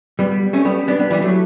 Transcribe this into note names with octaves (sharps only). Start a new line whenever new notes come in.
G3 B3
A3 C#4
G3 B3
B3 D4
G3 B3
E3 G3
F#3 A3